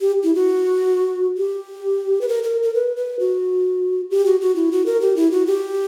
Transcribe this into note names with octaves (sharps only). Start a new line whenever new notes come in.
G4
E4
F#4
G4
B4
A#4
A#4
A#4
B4
B4
F#4
G4
F#4
F#4
E4
F#4
A#4
G4
E4
F#4
G4